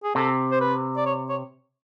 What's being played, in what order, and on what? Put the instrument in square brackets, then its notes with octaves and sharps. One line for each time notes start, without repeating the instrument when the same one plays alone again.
[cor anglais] G#4
[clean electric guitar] C3 [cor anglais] A4
[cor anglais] C5
B4
D5
C#5
C#5